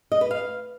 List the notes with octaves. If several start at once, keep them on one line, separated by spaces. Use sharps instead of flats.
D#5
B4
F5